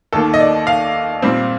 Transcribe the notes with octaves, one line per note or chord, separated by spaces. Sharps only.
D#2 D#3 A#3 A4
D#5
D5
F5
A#2 G3 C4